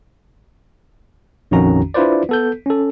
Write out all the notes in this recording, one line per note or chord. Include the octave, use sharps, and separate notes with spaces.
A#1 F2 D#3 C#4 F#4 A#5
D4 E4 F4 B4 C5 D5
B3 A4 G6
C#4 A4